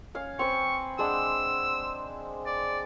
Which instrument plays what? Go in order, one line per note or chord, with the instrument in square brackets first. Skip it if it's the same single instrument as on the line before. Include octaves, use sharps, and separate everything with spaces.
[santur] C#4 F5
[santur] C4 B4 [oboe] C#6
[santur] G#3 D4 F#5 [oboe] E6
[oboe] D5